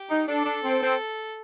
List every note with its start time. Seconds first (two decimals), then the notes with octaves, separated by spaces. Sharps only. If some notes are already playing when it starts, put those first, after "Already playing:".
Already playing: G4
0.10 D#4
0.28 D4 A4
0.45 D4
0.64 C4
0.82 C4